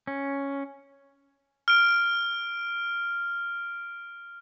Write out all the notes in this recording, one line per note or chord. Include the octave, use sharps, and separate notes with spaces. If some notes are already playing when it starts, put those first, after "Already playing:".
C#4
F6 D7